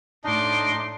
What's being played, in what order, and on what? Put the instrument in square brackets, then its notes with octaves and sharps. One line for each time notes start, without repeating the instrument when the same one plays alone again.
[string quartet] A2 C6 D6 [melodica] D4 D#4 D#5